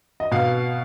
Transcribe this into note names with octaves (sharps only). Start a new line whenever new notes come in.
D#5
B2 F5